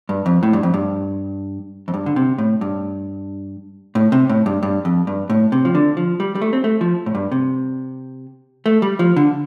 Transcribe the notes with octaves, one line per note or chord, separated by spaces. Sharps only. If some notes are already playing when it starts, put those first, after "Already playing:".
G2
F2
A2
G2
F2
G2
F2
G2
D3
C3
A2
G2
A2
C3
A2
G2
G2
F2
G2
A2
C3
F3
D3
F3
G3
G3
A3
C4
A3
F3
A2
G2
C3
A3
G3
F3
D3